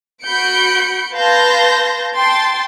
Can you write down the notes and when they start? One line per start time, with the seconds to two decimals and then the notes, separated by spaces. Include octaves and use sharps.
0.24 F#4 B5 G6 C#7 D7
1.15 B4 F5 A5 C6 G6 A#6
2.15 G5 A5 C6 A6